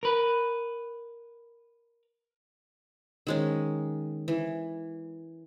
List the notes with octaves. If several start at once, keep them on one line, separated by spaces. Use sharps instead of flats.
A#4 B4
D#3 G#3 C#4
E3